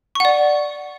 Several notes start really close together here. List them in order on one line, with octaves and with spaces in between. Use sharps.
C#6 F#5 D5